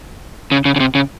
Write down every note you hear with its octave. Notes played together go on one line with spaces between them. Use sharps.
C#3
C#3
C#3
C3
C#3